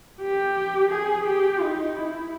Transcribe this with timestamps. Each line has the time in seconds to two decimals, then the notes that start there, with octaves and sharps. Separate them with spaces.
0.21 G4
0.90 G#4
1.27 G4
1.62 D#4
1.96 E4